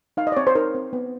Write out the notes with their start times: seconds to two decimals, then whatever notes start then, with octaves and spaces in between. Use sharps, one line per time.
0.17 D#4 F5
0.27 D#5
0.32 D5
0.37 C4 C#5
0.47 C5
0.55 D#4 A#4
0.75 C4
0.93 B3